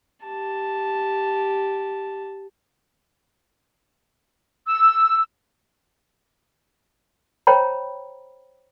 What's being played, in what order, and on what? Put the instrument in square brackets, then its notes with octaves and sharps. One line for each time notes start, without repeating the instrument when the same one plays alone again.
[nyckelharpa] G4 A5
[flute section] E6
[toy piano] C5 C#5 G5 A#5 B5